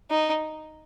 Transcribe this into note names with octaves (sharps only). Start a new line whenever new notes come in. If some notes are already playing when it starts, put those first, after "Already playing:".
D#4